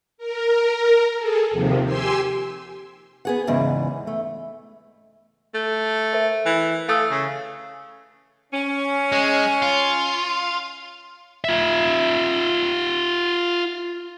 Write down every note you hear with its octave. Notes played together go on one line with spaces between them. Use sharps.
A#4
G#4 A4
D#2 C3 D#3 F3
G4 G#5 C6 E6
B3 G#4 F#5
E2 G#2 C#3 E3
A3
A3
A#4 C5 E5
E3
A3 F5 D#6 E6
C#3
C#4
G#3
F4
F4 E5